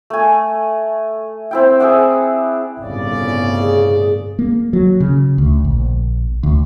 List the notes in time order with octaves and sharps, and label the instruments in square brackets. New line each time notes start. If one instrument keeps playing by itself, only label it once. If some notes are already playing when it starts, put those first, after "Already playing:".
[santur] A3 G#5
C4 E4 G5
G#4 D5 E5 F#5
[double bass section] G1 A2 [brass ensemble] C2 C#3 D5
[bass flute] G#4
[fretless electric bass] A#3
F#3
C#3
D2
A#1
D2